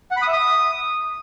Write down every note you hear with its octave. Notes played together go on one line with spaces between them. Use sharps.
F#5
B5
D#6
E5
D#6